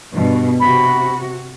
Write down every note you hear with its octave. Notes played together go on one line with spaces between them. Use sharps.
G2 B2
C3 F#4 B5